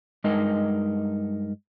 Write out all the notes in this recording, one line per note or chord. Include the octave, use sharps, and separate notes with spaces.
G2 G#3 D#4 A#4 D#5